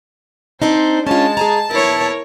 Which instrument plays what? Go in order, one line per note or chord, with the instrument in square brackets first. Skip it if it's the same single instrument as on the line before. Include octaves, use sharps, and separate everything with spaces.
[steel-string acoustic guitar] C4 D4 D#4 [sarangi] C5
[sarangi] G#3 [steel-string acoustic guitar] C#4 F4 [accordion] A5
[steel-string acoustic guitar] G#4 G#5 A#5
[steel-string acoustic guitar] E2 [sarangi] E4 [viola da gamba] A#4 C#5